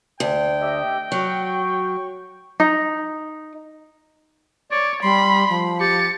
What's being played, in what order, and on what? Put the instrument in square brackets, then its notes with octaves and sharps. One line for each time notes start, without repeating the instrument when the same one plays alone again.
[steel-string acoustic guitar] D2 [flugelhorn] G5
[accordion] G4 D#5 E5
[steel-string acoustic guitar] F#3 [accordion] C#6
[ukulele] D#4
[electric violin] C#5 [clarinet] D5
[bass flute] G3 [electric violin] B5 [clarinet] C6
[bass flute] F3
[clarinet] G4 [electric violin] A6 C#7